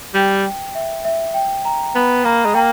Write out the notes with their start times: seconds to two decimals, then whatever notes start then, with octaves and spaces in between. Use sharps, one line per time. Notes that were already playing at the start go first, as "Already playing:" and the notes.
0.14 G3 G5
0.75 E5
1.05 E5
1.34 G5
1.65 A#5
1.95 B3 B5
2.25 A#3 A#5
2.45 G#3
2.55 A#3 G5